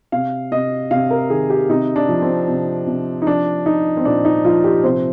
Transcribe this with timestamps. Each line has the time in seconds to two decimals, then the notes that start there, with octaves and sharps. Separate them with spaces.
0.12 C3 F5
0.52 C3 D#5
0.91 C3 F5
1.11 A#4
1.30 D#3 G#4
1.50 G4
1.69 C3 D#4
1.96 D4
2.09 F3
2.22 C4
2.48 C3
2.87 C3
3.22 D#4
3.27 F3 D4
3.66 F3 D#4
3.97 C4
4.05 A#2 D4
4.25 D#4
4.44 F3 F4
4.64 G4
4.84 C3 C5